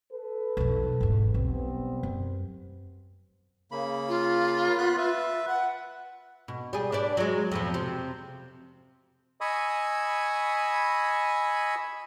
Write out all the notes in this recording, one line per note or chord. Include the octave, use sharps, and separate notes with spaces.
A4 B4
B1 F2
G#1 E2
B1 G3 B3 C4
F#2
C#3 A#3 B5
F4
B3 B5 F#6
B4 E5
F#5
B2
G3 G#4
D4 B4 D5
F#3 G#3
F2 B2 F3
C3
D#5 G#5 B5 C#6 D#6 E6